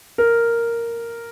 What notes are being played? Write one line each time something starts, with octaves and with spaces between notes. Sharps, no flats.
A#4